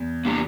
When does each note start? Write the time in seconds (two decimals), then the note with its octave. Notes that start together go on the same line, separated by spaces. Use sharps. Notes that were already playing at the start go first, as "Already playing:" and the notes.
Already playing: E2
0.25 A#3 D4 G4